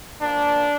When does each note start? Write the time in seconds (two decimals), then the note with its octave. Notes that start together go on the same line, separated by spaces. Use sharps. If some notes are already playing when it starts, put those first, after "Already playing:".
0.21 A#2 F3 A#3 D4